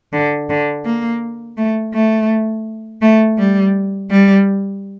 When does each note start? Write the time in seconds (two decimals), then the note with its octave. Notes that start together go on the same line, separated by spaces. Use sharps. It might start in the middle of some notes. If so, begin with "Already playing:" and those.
0.13 D3
0.50 D3
0.85 A#3
1.57 A3
1.94 A3
3.02 A3
3.38 G3
4.10 G3